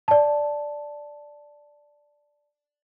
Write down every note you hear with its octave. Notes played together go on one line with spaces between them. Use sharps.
D5 A5